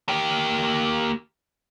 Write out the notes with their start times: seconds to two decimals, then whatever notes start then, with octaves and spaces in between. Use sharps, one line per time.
0.08 A#3 G4